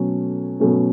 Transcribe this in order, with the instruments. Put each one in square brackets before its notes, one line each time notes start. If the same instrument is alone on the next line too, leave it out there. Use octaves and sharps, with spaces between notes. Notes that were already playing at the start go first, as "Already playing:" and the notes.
Already playing: [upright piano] B2 F#3 A3 C#4
B2 F#3 A3 C#4